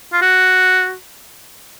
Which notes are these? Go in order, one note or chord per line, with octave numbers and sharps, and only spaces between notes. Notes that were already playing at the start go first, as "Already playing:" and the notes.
F4
F#4